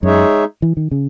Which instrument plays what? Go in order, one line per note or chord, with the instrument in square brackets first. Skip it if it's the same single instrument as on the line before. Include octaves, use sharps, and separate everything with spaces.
[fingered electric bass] F#2 [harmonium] G#3 D#4 G#4 C#5 E5
[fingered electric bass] E3
D#3
C#3